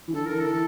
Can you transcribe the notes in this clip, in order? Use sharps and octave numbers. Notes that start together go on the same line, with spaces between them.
E3
D3 A4
A#4
E3
A4